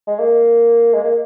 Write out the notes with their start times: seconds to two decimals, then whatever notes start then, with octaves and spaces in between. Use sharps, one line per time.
0.07 G#3
0.19 A#3
0.94 G#3
1.04 A#3